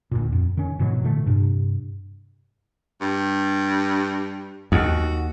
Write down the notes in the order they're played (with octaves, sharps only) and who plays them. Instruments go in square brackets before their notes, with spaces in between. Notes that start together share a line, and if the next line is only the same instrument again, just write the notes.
[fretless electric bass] D2 A#2
F2
D#3 C#4
G#2 B2 E3 F#3
A#2 D3 E3 A3
G2 C3
[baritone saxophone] G2
[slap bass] D#2 [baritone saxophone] F#4